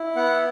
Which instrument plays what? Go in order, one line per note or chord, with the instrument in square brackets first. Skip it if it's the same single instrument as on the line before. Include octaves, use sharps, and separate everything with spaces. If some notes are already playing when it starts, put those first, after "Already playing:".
Already playing: [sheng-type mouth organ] E4
B3 F#5